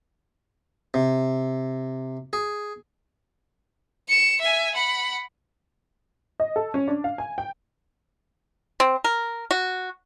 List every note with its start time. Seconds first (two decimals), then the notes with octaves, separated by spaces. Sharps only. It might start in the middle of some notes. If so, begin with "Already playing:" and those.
0.94 C3
2.33 G#4
4.08 C#7 E7
4.41 E5 G#5
4.74 F#5 B5
6.40 D#5
6.56 A4
6.74 C#4
6.88 D4
7.04 F5
7.18 G#5
7.38 G5
8.80 C4
9.04 A#4
9.51 F#4